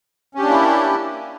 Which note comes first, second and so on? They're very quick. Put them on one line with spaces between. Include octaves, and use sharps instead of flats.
C#4 G4 D4 A#3 E4